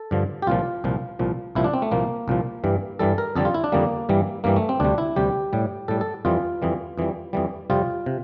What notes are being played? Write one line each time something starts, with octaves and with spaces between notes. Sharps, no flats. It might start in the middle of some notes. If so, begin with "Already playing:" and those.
Already playing: A4
G2 D3 F3
G4
C2 A#2 F3 F4
C2 A#2 F3
C2 A#2 F3
C2 A#2 F3 E4
D4
C4
A3
C2 A#2 F3 A#3
C2 A#2 F3
G2 E3 G3
G2 E3 G3 A4
A#4
F2 D3 G3 A4
F4
E4
D4
F2 D3 G3 A#3
G2 E3 G3
G2 E3 G3 A#3
A3
C4
D2 C3 G3 D4
E4
D2 C3 G3 G4
A2 G3
A2 G3 A4
A4
F2 E3 G3 F4
F2 E3 G3
F2 E3 G3
F2 E3 G3
F2 C3 G3 F4
C3